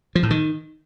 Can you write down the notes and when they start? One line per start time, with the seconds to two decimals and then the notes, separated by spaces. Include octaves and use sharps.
0.15 F3
0.23 A2
0.31 D#3